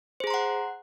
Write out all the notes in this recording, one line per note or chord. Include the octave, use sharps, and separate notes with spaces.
G#4 C5 F#5 A#5 C6